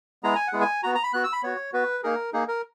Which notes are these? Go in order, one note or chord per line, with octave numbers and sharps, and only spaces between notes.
G#3 B3 E4 G#4 A#5
G#5
F#5
G#3 B3 E4 G#4
G#5
B3 F#4 A#5
A#5
B5
B3 F#4 F#6
E6
B5
B3 F#4 C#5
B3 F#4 B4
A#3 D#4 G#4 A#4
A#3 D#4 G#4
A#4